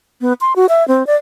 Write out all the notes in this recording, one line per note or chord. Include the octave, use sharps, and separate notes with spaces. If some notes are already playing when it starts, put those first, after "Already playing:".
B3
C6
F#4
E5
C4
D5